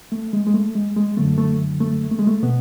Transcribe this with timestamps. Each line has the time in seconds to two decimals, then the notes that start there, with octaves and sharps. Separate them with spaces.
0.12 A3
0.33 G#3
0.46 G#3
0.54 A3
0.75 G#3
0.96 G#3
1.17 F#2 D3 F#3 A3
1.38 A3
1.80 A3
2.11 A3
2.19 G#3
2.27 A3
2.43 B2 B3